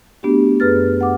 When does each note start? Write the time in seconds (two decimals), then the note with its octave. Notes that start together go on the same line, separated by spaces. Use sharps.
0.23 A3 B3 D4 F#4 G4
0.60 F#2 G#4 B4 F6 A6
1.01 F#5 D6